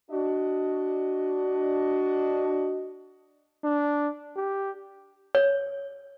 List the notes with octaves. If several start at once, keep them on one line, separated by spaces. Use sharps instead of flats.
D4 F#4 D#5
D4
G4
C#5